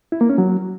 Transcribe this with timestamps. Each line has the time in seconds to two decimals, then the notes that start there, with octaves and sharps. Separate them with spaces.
0.12 E4
0.21 A#3
0.30 C#4
0.38 F#3